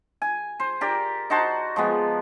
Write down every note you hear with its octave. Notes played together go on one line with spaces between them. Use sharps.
G#5
C5
G4 A#4 D5
D#4 F#4 C5 A5
F3 G#3 B3